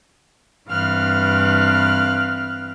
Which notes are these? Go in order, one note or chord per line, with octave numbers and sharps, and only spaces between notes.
G2 E3 C4 F5 F6 F#6